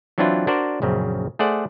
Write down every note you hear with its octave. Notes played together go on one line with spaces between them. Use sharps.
E3 F#3 C4 D4 E4 F4
D4 F#4 A#4 C5 D5
A#1 F#2 C#3 C4
A3 G#4 C5 D5 F#5